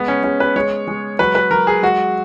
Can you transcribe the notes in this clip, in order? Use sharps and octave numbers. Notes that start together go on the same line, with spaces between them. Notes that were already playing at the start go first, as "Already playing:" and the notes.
Already playing: G#3 B3
C#4
G#3 C#4
B4
G#3 C#5
G#3
F#3 B4
B4
F#3 A#4
G#4
G#3 F#4